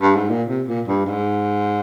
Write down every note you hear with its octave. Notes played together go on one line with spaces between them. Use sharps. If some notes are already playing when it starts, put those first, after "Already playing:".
G2
G#2
A#2
C3
A#2
G2
G#2